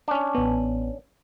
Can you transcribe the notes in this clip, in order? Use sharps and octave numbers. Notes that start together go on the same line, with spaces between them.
C#4 D4
A1 B3